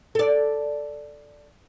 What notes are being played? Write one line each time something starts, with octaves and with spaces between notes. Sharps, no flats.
A4 D5